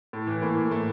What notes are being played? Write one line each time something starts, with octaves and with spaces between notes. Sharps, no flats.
A2
E3
A2 A#3
A2
A2 A3